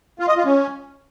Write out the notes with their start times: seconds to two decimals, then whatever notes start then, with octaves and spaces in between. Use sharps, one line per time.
0.19 F4
0.28 D#5
0.36 F4
0.45 C#4